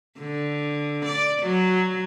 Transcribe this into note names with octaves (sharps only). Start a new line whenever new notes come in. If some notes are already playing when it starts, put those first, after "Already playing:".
D3
D5
F#3